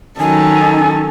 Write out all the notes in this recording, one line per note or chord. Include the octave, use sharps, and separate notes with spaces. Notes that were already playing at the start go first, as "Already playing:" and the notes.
D#3 F#3 C#4 D#4 A4 G#5